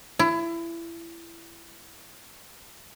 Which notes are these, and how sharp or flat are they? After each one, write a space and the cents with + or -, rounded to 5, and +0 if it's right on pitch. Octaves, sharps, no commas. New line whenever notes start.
E4 +25